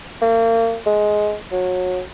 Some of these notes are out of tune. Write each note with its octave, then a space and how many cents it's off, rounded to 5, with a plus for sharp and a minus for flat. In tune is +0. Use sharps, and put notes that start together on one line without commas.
A#3 -35
G#3 +15
F#3 -25